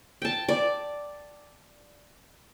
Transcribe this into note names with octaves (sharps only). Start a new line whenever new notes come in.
G5 A5
D5